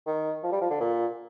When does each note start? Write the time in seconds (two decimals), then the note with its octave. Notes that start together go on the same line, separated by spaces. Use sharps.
0.07 D#3
0.43 F3
0.52 G3
0.61 F3
0.71 D3
0.80 A#2